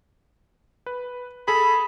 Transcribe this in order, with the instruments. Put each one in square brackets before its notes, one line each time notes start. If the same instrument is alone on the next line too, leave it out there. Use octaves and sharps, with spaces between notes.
[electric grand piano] B4
[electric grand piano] G#4 A4 [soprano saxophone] B5